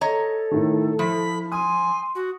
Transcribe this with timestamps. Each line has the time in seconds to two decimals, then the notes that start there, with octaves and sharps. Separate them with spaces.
0.01 A4 C#5 D#5 A#5
0.51 A2 D#3
0.99 F3 E4 B5
1.52 G#5 C6 D#6
2.15 F#4